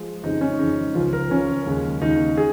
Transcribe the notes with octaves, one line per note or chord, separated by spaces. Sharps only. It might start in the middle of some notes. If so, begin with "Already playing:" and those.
Already playing: F3 G#3
F2 C#3 G#3 D#4
C#4
F2 C#3 G#3 D#4
C#2 C#3 F3 F4
A#4
C#2 C#3 F3 C#4
D#2 C#3 G#3
D#2 C#3 G#3 D#4
G#4